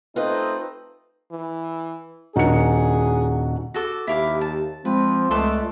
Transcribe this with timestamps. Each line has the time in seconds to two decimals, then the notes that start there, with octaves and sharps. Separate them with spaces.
0.16 A3 C4 D#4 F4 B4 D#5
1.32 E3
2.36 D#1 D4 D#4 F#4 G#4 C#7
3.74 F#4 A4 D6
4.07 D#2 E4 G4 F5 D6
4.41 A5
4.85 F3 G#3 C4 B4
5.31 C#2 A3 D5 A5 C6 F#6